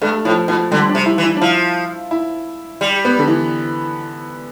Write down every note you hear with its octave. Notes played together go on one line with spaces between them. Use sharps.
G2 A3
A2 F3
B2 F3
D3 G3
D4
C3
E4
E3
E4
D4
F3 E4
E4
G3
B3
D3
E3